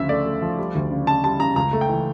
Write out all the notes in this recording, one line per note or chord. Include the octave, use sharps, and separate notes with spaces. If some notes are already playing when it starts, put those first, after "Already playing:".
Already playing: D2 C#3 F3 E5
A3 D5
A3
F3
G3
D2
C#3
C#3 A5
G3 A5
C#3 A#5
C#2 A#5
A3
G5
E3